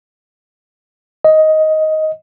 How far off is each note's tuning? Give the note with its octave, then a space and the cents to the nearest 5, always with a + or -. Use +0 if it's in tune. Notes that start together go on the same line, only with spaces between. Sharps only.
D#5 +10